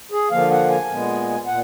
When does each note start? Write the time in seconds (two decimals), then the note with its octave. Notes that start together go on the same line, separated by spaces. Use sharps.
0.12 G#4
0.31 D3 F3 A#3 F5
0.51 F#5
0.69 G#5
0.89 A#2 G#3 B3
1.46 A#2 F#5